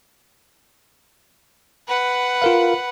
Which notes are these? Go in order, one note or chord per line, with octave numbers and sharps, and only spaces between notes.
B4 F#5
F4 A#4 F5